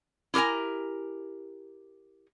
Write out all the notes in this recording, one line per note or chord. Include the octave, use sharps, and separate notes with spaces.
E4 G4 A#4 G#5 A#5